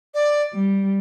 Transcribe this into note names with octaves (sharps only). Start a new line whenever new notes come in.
D5
G3